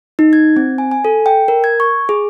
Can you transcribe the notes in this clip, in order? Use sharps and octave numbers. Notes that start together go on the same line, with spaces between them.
D#4
G#6
C4
G#5
G#5
A4
G5
A#4
G#6
C#6
G#4